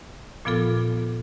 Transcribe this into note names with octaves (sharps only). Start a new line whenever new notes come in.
A#2 F3 B3 F4 A4 D6